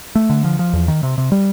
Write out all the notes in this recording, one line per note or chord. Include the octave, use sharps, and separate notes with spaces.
A3
D3
F3
F3
E2
D#3
C3
C3
G3